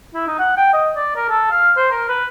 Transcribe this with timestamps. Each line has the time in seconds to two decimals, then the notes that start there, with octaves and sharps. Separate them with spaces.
0.14 E4
0.27 D#4
0.39 F#5
0.57 G5
0.74 D#5
0.96 D5
1.16 A#4
1.29 A4
1.51 F5
1.77 C5
1.91 A#4
2.09 B4